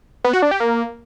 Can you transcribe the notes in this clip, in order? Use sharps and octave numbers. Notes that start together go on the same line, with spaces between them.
B3
F#4
D4
G4
A#3